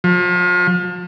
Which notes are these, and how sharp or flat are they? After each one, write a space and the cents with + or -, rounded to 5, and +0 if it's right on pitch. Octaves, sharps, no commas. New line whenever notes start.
F3 +35